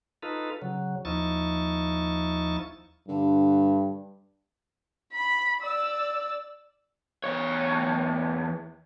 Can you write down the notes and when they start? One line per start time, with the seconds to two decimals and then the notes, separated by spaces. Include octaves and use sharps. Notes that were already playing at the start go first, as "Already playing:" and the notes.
0.22 D#4 F4 A4 B4
0.62 C#3 F#3
1.05 D#2 F3 D#4 E4 C#6 A6
3.08 G2 D3
5.12 B5
5.61 D5 E6
7.24 E2 C#5